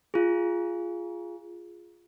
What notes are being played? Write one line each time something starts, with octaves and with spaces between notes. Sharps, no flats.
F4 G#4